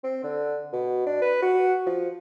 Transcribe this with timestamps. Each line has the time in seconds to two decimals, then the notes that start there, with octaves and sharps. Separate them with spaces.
0.04 C4
0.23 D3
0.73 B2
1.06 D4
1.22 B4
1.42 F#4
1.86 F3